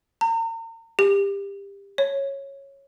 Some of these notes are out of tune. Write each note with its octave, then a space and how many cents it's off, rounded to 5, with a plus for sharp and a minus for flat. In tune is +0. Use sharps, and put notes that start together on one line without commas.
A#5 -40
G4 +25
C#5 -10